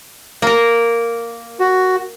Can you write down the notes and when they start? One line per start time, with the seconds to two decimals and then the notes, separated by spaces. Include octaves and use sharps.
0.42 A#3 A#4
1.60 F#4